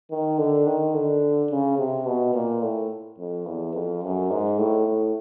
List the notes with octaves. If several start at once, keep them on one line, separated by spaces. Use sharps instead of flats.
D#3
D3
D#3
D3
C#3
C3
B2
A#2
A2
F2
E2
F2
F#2
G#2
A2
A2